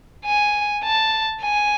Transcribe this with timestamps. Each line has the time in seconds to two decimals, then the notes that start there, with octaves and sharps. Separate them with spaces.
0.26 G#5
0.83 A5
1.42 G#5